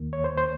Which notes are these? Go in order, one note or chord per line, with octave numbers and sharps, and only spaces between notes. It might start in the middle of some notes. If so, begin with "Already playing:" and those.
Already playing: D#2 D#3 A#3
C#5
C5
C5